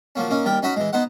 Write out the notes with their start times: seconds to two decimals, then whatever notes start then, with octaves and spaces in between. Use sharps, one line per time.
0.16 F3 F#3 A#3 C#4
0.30 A#3 C#4 D#4
0.45 D#2 G3 A#4 G5
0.62 C#4 D#4 F#4 D#5 B5
0.76 E3 G#3
0.93 B3 D#4 C5 F#5